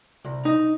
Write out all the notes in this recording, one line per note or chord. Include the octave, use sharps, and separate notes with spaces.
C2
D#4